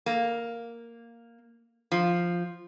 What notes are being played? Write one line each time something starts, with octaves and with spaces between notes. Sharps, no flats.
A#3
F3